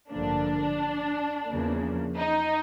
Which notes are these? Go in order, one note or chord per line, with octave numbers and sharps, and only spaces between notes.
A1 G2 D3 F3 A#3 D4
E2 C#3 F3 A#3
D#4